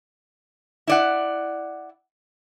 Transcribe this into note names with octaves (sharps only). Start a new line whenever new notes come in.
E4 D5 F#5